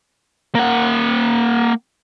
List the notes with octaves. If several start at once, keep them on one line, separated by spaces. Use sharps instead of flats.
A#3 F#5